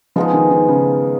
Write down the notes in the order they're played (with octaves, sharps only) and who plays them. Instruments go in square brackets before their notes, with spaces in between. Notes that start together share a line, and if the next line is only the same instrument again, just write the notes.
[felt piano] F3 [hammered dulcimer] G#3 B3 D#4
[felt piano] D#3
D#3
C#3